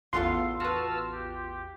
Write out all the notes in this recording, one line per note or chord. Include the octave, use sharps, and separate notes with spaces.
A1 E2 B3 F4 A4 F5 C6
F#4 B4 A5 E6 F6
G4